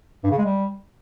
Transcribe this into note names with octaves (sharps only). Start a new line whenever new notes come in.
G2
C#3
G#3
G3